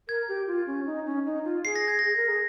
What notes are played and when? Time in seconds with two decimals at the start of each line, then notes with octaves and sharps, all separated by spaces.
0.08 A#4 G#6
0.28 G4
0.47 F4
0.67 C#4
0.86 D#4
1.06 C#4
1.26 D#4
1.44 F4
1.65 G#4 C7
1.76 A#6
1.88 G#6
1.99 G#4 A#6
2.16 A#4
2.28 G#4